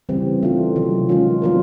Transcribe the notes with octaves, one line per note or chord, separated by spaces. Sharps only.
C#3 E3 G3 C4
E3 A3 D4 F4
C3 D#3 F#3
D#3 G#3 C#4 F4
F#3 B3 D4 F4 A#4